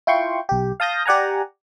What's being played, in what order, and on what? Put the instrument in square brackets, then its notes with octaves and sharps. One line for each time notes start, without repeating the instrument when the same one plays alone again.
[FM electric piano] E4 F4 G5 C6 C#6
B1 G4
F5 A5 D#6 G6 A#6
G4 D5 F#5 G#5 A#5